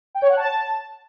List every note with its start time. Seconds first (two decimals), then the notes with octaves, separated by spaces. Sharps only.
0.15 G5
0.22 C#5
0.29 F#5
0.37 A5